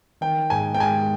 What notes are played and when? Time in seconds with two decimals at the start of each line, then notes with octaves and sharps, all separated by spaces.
0.21 D#3 G5
0.50 G#2 G#5
0.74 G5
0.80 G#3 G#5